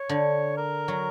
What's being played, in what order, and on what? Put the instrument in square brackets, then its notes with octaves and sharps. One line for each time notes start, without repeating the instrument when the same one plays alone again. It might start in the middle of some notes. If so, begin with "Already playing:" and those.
Already playing: [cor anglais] C#5
[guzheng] D3
[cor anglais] A#4
[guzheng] F#3